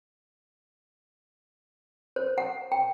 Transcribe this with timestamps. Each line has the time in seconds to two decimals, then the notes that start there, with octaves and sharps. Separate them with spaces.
2.16 C5
2.38 F#5
2.72 G5